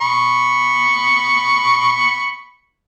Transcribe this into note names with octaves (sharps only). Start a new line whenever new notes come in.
B5 C#6